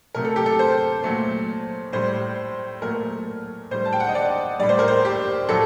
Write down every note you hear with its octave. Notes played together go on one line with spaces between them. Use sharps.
C3 F#3 A3 A#4
A4
G4
A4
C5
A#2 F#3 A3
A2 G3 C5
A#2 F#3 A3 A#4
A2 G3 C5
A5
G5
F#5
D#5
D5
A2 G3 D5
C5
A#4
C5
G4
A2 F#3 A3 A4